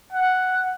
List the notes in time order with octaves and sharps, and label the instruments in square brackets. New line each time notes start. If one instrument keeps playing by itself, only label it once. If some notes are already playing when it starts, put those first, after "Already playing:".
[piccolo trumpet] F#5